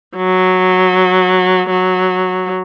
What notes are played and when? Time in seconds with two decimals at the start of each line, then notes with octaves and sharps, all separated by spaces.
0.17 F#3
1.70 F#3